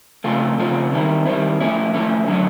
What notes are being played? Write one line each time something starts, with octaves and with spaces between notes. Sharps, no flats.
C#3 F3 A3 C4 F4
C#3 F3 A3 C4 F4
D#3 G3 C4 E4
D#3 G3 C4 E4
F3 A3 C#4 E4
F3 A3 C#4 E4
D3 F#3 A3 C#4